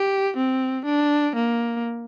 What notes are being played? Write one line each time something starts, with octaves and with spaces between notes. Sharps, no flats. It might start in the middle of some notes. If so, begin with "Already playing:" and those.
Already playing: G4
C4
D4
A#3